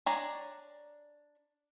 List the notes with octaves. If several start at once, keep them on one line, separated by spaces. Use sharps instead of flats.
D4 C#5 D5 G#5 A#5